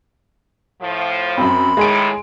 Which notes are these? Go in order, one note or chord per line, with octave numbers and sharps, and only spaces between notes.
A2 F3
F#2 C4 B5
A2 D#3 G#3 G#4 D7